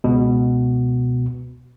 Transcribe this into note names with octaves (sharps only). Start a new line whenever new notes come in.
C#2 B2